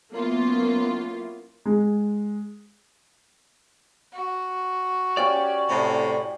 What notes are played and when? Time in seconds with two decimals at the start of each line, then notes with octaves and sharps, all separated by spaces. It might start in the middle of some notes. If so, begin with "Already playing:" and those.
0.11 F#3 A#3 B3 C#4 E4 F4
1.66 G#3
4.12 F#4
5.17 C#4 G4 D5 F5
5.69 A2 C3